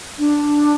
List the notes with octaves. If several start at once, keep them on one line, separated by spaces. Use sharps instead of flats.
D4